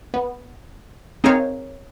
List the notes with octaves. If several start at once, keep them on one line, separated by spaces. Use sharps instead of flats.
B3
C4 D#4 G#4 A#4 C#5 F5